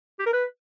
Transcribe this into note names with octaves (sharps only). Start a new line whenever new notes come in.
G4
A#4
B4